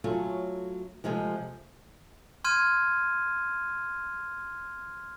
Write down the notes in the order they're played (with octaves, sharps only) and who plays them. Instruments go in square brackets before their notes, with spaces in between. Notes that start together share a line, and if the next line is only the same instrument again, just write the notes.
[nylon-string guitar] F#3 A3 C#4 F4
C3 F3 G#3 A3 G#4
[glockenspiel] C6 F6 G6 G#6 D#7